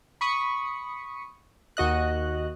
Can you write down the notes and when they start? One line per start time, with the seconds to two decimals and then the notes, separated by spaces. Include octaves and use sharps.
0.21 B5 C#6 D#6 B6 C#7
1.77 D#2 F#4 D#5 F#6